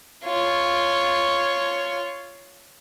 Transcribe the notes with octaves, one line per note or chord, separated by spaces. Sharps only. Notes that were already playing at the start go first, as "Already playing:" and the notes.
F4 C#5